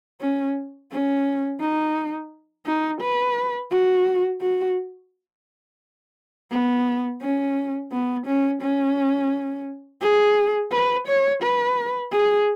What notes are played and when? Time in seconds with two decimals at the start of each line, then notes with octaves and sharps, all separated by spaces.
0.21 C#4
0.92 C#4
1.61 D#4
2.66 D#4
3.01 B4
3.71 F#4
4.41 F#4
6.52 B3
7.22 C#4
7.92 B3
8.27 C#4
8.62 C#4
10.01 G#4
10.72 B4
11.07 C#5
11.42 B4
12.12 G#4